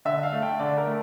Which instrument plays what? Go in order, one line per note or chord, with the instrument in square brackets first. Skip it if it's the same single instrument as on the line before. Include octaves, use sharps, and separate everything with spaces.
[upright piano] D3 E5
F5
A3
G5
D3 D5
A#4
A3